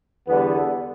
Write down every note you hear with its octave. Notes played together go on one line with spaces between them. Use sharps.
E2 D3 G3 B3